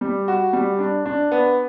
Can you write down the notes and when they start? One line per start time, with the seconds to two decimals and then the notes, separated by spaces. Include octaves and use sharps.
0.01 G3
0.28 F#4
0.53 G3
0.79 D4
1.06 D4
1.31 B3